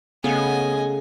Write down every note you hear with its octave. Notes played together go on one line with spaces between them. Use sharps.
C#3 A3 B3 D#5 F5 G#5